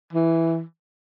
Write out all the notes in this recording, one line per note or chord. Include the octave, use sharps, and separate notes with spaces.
E3